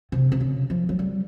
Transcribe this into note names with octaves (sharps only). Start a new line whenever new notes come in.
C3
C3
C#3
F3
F#3
G3